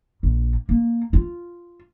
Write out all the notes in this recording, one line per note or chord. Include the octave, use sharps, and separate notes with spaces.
A#1
A#3
F4